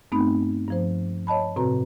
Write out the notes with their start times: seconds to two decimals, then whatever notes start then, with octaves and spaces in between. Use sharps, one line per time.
0.12 G2 A3 B3 C4 D#4 B5
0.68 G2 F3 C5
1.27 C#5 D#5 A5 B5
1.56 A2 C3 C4 F#4 B4 A#5